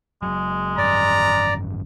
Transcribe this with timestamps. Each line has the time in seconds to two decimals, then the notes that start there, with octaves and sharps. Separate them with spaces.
0.23 F#1 F#3 G#3
0.78 G#1 F#2 D5 A#5